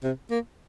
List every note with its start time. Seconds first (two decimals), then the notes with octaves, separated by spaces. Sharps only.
0.03 C3
0.31 A#3